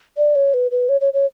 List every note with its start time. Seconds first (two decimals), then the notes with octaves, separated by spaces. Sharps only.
0.17 D5
0.35 C#5
0.54 B4
0.71 B4
0.89 C#5
1.01 C#5
1.13 C#5